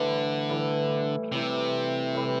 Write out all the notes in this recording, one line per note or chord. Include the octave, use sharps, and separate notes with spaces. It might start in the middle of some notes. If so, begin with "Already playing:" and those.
Already playing: A2 D3 E3 G3
A2 E3 G3
A2 C3 E3 G3
A2 E3 G3